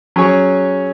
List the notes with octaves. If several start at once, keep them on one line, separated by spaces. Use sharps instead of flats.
F#3 C#4 G#4 C#5